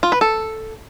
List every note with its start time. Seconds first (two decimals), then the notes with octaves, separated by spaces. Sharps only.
0.03 F4
0.12 B4
0.21 A4